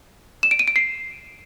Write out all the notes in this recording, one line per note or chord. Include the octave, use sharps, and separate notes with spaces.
E7
D7
D#7
D7
C7